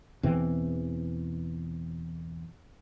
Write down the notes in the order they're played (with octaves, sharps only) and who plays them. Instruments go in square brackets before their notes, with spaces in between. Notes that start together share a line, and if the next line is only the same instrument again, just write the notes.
[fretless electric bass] E2 B2 E3 C4